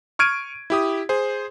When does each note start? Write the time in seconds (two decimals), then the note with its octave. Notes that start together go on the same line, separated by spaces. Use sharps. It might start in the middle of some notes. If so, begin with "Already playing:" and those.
0.19 C#6 F6 G#6 D7 D#7
0.70 E4 G4 D#6
1.09 G#4 C5